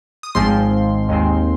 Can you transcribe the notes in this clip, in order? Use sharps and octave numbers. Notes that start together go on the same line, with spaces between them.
D#6
G#1 G#2 F3 G#3 C4 C6
D#2 D#3 G#3 C4